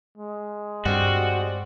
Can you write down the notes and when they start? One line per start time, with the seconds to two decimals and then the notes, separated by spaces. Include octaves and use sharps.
0.18 G#3
0.85 G2 G3 C4 F#4